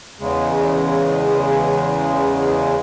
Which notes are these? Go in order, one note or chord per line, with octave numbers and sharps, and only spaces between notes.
E2 C#3 G#3